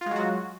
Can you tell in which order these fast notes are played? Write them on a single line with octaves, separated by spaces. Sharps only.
F4 G#3 F#3 F#4